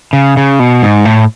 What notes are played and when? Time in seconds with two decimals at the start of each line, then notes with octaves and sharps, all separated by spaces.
0.13 C#3
0.37 C#3
0.59 B2
0.82 G#2
1.05 A2